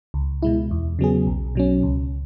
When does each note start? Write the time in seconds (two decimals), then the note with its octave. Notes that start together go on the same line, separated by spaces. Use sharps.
0.14 C#2
0.42 B2 G#3 E4
0.71 E2
0.99 C#3 F#3 B3 G#4
1.27 B1
1.55 B2 F#3 C#4
1.83 C#2